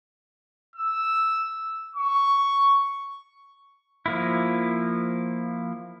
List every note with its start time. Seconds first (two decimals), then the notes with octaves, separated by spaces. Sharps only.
0.76 E6
1.96 C#6
4.06 F3 A#3 E4